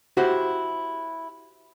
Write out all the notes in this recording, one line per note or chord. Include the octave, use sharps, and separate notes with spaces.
E4 F#4 G4 C5